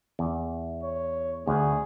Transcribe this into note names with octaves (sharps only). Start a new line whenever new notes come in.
E2
C#5
D2 G#4